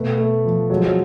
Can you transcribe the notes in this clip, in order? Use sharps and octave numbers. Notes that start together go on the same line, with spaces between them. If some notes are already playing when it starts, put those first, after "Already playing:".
Already playing: B2 A3 B4
A3
F3
F#3 G#3
F3
F#3